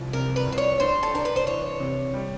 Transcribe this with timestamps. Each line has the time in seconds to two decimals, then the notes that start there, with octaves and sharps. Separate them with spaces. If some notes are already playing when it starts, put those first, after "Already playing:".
Already playing: C2 F3
0.13 C3 A#4
0.36 B4
0.47 C2
0.52 C5
0.58 C#5
0.80 D4 C5
1.03 A4
1.14 D4 A#4
1.25 B4
1.36 C5
1.47 E3 C#5
1.80 C3
2.14 G3